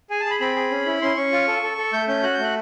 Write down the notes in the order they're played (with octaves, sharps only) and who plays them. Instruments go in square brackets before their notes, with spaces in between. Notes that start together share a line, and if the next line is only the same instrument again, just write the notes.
[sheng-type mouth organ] G#4 G#5
A5
G#4 B5
C4 B5
G#4
C#4
E4
C#4 C6
C#4 C#6
F4
A4
A4
A4
A3 G6
C#4 G6
F#4 F#6
G6
A3 F#6